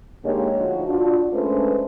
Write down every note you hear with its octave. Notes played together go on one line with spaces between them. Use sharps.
D3 G#3 A#3 D#4 G4 C#5
D2 F3 D#4 F#4
D4 F4 F#4
G#3 A3 C#4 D4 B4 C5